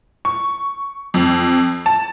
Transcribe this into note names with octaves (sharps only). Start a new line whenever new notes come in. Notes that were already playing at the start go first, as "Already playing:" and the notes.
C#6
F2
A5